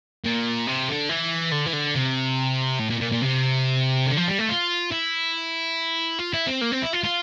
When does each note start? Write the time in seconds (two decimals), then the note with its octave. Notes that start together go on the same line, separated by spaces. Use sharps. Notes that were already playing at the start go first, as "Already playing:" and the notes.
0.25 A#2
0.67 C3
0.88 D3
1.09 E3
1.52 D3
1.66 E3
1.73 D3
1.95 C3
2.79 A2
2.90 A#2
3.01 A#2
3.12 A#2
3.22 C3
4.07 D3
4.17 F3
4.28 G3
4.39 A3
4.49 F4
4.92 E4
6.19 F4
6.33 E4
6.47 C4
6.61 A#3
6.72 C4
6.82 E4
6.93 F4
7.04 F4